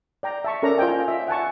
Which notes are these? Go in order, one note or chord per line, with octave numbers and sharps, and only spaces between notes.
D5 G5 A#5
E5 A5 C#6
C#4 A4 A#4 C#5 D5 A#5
F4 C5 D#5 G5 G#5
E5
F#5 G#5 A5 C#6